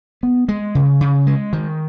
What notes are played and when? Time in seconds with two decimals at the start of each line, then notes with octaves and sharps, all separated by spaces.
0.23 B3
0.48 G#3
0.75 C#3
1.01 C#3
1.27 G#3
1.53 D#3